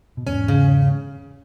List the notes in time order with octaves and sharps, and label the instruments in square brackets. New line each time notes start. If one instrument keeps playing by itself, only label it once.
[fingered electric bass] B2
[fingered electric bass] E2 G#2 [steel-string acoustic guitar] C#4
[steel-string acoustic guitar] C#3